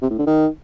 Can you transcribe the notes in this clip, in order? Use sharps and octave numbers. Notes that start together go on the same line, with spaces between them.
C3
A2
D3
D#3